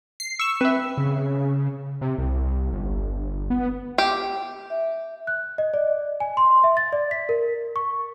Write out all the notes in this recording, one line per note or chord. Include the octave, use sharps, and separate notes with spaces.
C7
C#6 E6 E7
C4 B4 E5
C#3
C3
C2
G1
B3
G4
E5
F#6
D#5
D5
G#5
C6
E5
A6
D5
B6
A#4
C#6